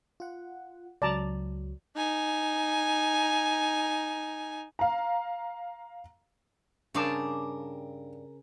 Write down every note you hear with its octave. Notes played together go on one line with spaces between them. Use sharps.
F4 F#5
C#2 F#3 D5 A5 A#5
D#4 G#5
F5 A#5
G2 C#3 C4 D4 A#4 D5 F5 A5